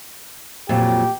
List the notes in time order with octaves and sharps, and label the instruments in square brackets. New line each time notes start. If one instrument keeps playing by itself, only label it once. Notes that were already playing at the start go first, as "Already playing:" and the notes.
[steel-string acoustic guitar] F2 A#2 F#3 [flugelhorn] G4